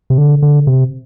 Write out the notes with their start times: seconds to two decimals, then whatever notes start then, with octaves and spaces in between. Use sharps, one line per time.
0.10 C3
0.18 D3
0.42 D3
0.67 C3